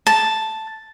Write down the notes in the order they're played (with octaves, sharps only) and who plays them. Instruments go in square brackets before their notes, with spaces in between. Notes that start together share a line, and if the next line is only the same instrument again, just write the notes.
[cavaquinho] A5